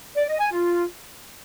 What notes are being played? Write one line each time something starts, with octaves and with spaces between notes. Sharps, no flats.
D5
D#5
G#5
F4